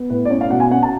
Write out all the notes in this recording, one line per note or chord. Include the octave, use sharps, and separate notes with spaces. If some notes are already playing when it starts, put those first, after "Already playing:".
Already playing: B3
A2 B4
D5
C#4 C#5
F5
B2 F#5
G#5
C#4 F#5
A5